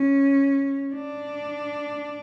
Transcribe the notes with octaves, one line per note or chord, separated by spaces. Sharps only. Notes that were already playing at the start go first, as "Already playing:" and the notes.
Already playing: C#4
D4